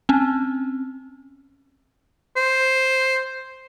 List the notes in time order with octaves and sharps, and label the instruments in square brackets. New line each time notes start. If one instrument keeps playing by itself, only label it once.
[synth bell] C4 C#4
[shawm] C5